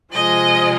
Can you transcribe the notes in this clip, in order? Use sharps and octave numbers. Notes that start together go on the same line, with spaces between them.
C3 F3 G#3 D#5